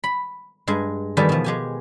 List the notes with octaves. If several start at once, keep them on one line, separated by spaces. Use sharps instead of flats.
B5
G2 G#3 G#5
E2 D#3 G3 A4 B4 G#5
B2 F3
G#3 G4 G#5